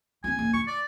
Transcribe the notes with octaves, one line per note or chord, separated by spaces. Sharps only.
C4 F4 G#5
F#1
F4 C#6
D5